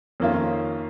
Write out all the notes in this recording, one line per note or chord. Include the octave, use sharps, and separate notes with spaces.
F2 D#3 A#3 C#4 F4